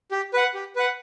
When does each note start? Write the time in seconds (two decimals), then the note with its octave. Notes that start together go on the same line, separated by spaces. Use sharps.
0.11 G4
0.34 B4 F#5
0.54 G4
0.76 B4 F#5